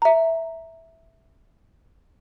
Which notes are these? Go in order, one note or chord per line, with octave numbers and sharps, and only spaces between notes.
E5 A#5